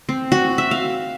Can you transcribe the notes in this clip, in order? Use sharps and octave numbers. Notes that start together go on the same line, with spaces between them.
C4
F#4
E5
F5